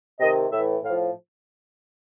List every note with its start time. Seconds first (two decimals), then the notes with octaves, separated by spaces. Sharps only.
0.20 C3 D#3 D#5
0.51 A2 E3 E5
0.83 A2 F3 F5